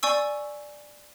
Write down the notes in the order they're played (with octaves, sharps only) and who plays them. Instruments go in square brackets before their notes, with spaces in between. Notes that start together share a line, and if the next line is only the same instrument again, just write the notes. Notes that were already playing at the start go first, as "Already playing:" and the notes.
[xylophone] D5 G#5 C#6 E6